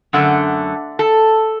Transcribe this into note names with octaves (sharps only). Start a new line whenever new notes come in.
F#2 D3 A3 F#5
A4